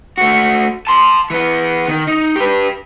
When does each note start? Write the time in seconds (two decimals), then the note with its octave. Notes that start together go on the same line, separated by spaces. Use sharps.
0.18 A3 F#4
0.87 A5 C6
1.30 E3 B3
1.88 D#3
2.07 D#4
2.36 G4 B4